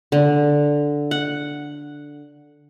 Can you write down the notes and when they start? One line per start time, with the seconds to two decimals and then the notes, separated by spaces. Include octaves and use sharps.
0.12 D3
1.11 F#5